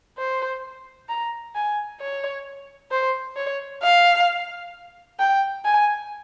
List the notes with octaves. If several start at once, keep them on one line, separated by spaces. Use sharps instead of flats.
C5
A#5
G#5
C#5
C5
C#5
F5
G5
G#5